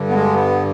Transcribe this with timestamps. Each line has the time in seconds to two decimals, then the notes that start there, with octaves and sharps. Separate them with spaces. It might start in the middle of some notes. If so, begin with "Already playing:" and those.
Already playing: G2 D3
0.09 B3
0.13 G#3
0.34 B3